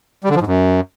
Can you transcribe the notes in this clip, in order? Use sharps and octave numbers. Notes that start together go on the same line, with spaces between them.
G3
D3
F3
G#2
F#2